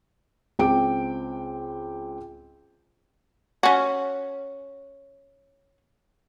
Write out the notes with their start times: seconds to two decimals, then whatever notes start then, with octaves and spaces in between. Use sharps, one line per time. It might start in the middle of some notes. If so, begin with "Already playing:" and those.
0.59 C#2 C4 G5 D6 D7
3.63 C#4 F#4